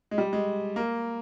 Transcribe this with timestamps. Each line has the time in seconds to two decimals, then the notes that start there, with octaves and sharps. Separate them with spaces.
0.11 G#3
0.18 G3
0.33 G#3
0.76 A#3